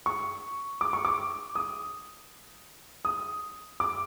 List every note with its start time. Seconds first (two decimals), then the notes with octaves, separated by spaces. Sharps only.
0.06 C#6
0.81 D6
0.93 C#6
1.05 D6
1.55 D#6
3.05 D#6
3.80 D6